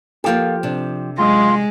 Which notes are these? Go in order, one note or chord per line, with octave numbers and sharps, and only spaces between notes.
F3 A#3 F4 G4 A4
C3 D4
F#2 G#3 F4 G4 D#5